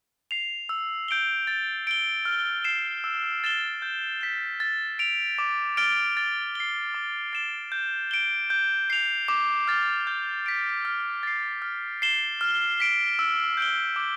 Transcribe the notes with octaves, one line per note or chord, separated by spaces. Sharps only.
C7 F7
E6
G6 D7 G7
A6
D7 G7
F6
C7 E7
E6
A6 E7 G7
G6
B6 E7
A6
D7 F7
D6
F6 A6 D7 G7
A6
C7 G7
D6
A6 E7 G7
G6
D7 G7
G6
C7 F7
D6
F6 A6
G6
B6 D7
F6
A6 C7
F6
C7 E7 G7
F6
B6 D7
E6
G6 D7 G7
D6